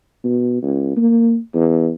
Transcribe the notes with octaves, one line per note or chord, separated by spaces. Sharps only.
B2
C#2
A#3
E2